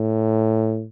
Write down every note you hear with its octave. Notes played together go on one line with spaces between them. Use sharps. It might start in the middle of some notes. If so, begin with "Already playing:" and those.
Already playing: A2